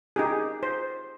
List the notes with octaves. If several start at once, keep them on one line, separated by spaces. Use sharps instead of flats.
D#4 G4 G#4
C5